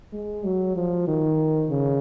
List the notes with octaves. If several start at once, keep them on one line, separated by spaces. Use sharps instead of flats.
G#3
F#3
F3
D#3
C#3